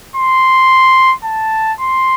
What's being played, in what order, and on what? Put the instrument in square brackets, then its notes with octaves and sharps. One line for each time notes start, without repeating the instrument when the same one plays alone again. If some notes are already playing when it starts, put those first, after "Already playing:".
[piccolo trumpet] C6
A5
C6